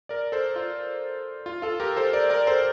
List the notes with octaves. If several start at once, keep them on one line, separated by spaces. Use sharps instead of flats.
A#4 D5
A4 C5
F4
F4
F4 A4
G4 A#4
A4 C5
A#4 D5
A#4 D5
A4 C5